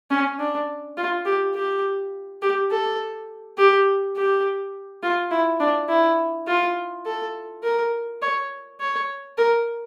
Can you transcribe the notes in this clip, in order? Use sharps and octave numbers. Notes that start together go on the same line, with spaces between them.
C#4
D4
F4
G4
G4
G4
A4
G4
G4
F4
E4
D4
E4
F4
A4
A#4
C#5
C#5
A#4